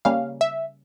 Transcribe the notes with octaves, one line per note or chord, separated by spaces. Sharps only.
C#3 G3 A#3 C#4 F5
E5